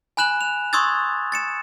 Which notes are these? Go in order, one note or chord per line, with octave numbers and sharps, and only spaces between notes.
G#5 B5 F#6 E7 F#7
F7
C6 C#6 D#6 E6 G#6 A6
A6 C#7 E7